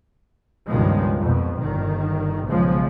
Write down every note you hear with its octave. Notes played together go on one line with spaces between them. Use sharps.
C#2 G2 B2 D#3 F3 G#3
F2 B2
G1 D#3
B1 C#3 F3 G#3